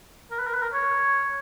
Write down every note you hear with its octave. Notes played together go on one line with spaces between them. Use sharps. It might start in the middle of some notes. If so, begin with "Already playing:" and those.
A#4
B4
A#4
B4
A#4
C#5